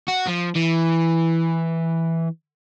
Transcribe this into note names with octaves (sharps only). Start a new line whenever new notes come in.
F#4
F3
E3